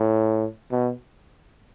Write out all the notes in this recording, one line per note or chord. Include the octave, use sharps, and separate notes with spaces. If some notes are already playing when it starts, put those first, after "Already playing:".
Already playing: A2
B2